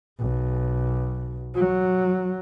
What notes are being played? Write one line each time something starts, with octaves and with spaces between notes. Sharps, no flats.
B1
F#3